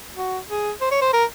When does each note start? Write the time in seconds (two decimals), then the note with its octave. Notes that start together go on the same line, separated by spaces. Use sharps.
0.16 F#4
0.49 G#4
0.81 C5
0.91 C#5
1.02 C5
1.13 A#4